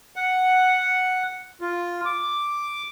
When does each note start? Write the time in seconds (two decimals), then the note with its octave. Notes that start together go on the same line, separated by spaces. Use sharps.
0.16 F#5
1.61 F4
2.05 D6